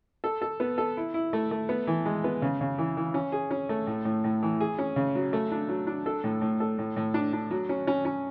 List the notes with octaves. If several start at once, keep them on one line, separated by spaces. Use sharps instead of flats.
A4
A4
B3
A4
E4
E4
A3
A3
B3
E3
G#3
B3
C#3
C#3
E3
E3
C#4
G#4
C#4
A3
A2
A2
A2
E3
G#4
C#4
C#3
F#3
A3
D4
F#3
D4
A4
A2
A2
A4
A2
A2
D4
D4
F#3
C#4
C#4
C#4